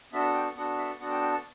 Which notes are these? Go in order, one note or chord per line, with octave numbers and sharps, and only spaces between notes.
B3 D4 F#4 A4 E5
G5
B3 D4 F#4 A4 F#5
E5
B3 D4 F#4 A4 F#5
G5
G5
A5